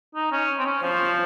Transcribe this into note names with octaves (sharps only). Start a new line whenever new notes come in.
D#4
C#4
C4
C#4
F3 C5